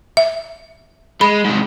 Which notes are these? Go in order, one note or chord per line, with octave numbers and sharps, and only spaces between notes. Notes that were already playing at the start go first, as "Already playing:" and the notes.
E5
G#3 B5
G#2 C3